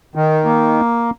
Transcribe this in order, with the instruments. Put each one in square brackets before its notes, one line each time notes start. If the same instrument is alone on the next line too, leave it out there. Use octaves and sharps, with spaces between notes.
[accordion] D#3
A#3